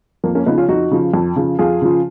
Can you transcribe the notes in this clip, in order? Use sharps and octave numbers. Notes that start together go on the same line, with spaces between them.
F2 A#3
A#3 C#4
C#3 F3 B3 D#4
C#4 F4
F2 D#4 F#4
C#3 F3
F2
C#3 F3
F2 F4 G#4
C#3 F3